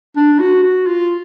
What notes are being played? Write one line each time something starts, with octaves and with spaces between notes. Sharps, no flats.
D4
F#4
F#4
F4